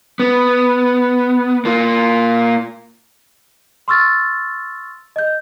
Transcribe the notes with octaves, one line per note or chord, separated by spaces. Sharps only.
B3
A#3 F4
C6 C#6 E6 F6 A6
D#5 G6